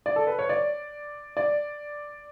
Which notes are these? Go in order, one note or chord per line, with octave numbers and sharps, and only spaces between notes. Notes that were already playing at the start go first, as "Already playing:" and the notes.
D5
A4
B4
C#5
D5
D5